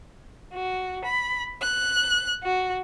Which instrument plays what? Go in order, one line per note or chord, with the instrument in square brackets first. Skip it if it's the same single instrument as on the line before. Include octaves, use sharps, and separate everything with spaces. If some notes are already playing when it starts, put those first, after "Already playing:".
[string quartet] F#4
B5
F#6
F#4